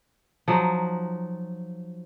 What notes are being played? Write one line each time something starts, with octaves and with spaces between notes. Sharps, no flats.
F3 F#3 D#4